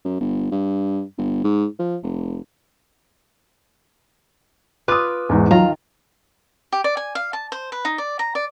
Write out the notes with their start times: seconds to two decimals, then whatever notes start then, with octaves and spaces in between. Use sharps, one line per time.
0.05 F#2
0.20 G1
0.52 G2
1.18 G1
1.44 G#2
1.79 F3
2.03 F1
4.88 F4 B4 D6 D#6
5.29 E2 G#2 E3
5.51 D#3 F#3 F4 A#5
6.72 G4
6.84 D5
6.97 G#5
7.15 F5
7.33 A5
7.52 C5
7.72 B4
7.85 D#4
7.98 D5
8.19 A#5
8.35 D5